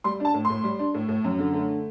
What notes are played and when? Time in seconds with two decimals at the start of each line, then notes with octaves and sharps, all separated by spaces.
0.04 G3 C6
0.20 D4 A5
0.34 A2
0.45 C6
0.50 A2
0.64 G3
0.79 D4
0.95 A2
1.09 A2
1.24 F#2
1.39 D3
1.54 A3